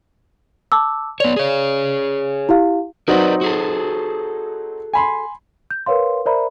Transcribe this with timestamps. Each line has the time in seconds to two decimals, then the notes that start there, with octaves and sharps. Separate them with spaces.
0.72 A5 D6 E6
1.20 B3 C#5 D5 F7
1.36 G#4 C#5
2.49 E4 G4 F5
3.08 F#3 C4 D#4 A#4 B4 D5
3.41 F#4 G#4 A4
4.93 G#5 B5 C6
5.71 G6
5.86 A#4 B4 C#5 F5 C6
6.26 A#4 C5 D5 E5 A#5 B5